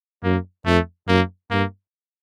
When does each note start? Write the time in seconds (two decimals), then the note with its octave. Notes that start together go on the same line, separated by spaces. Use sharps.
0.24 F#2 A#3
0.66 F2 A3
1.08 F#2 A#3
1.51 G2 A#3